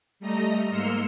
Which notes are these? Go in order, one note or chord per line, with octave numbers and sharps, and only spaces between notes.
G3 A3 D#5 A#5 A#6
G#2 A#3 C6 E6 F6 C#7